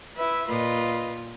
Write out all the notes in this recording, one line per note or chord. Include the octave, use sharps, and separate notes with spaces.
E4 B4 E5
A#2 F4 B4 D#5